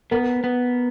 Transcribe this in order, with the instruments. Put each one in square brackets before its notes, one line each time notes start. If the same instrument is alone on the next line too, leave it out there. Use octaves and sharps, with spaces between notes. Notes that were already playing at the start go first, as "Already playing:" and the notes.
[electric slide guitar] B3 [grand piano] A#4
[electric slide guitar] B3